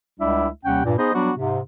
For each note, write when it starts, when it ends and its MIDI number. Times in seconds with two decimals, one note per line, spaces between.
0.20 0.47 37
0.20 0.47 55
0.20 0.47 56
0.20 0.47 62
0.20 0.47 64
0.20 0.47 76
0.65 0.84 39
0.65 0.84 48
0.65 0.84 55
0.65 0.84 61
0.65 0.84 78
0.65 0.84 79
0.85 0.98 43
0.85 0.98 46
0.98 1.11 59
0.98 1.11 63
0.98 1.11 68
0.98 1.11 72
0.98 1.11 75
1.14 1.31 54
1.14 1.31 55
1.14 1.31 59
1.14 1.31 62
1.14 1.31 66
1.37 1.60 44
1.37 1.60 48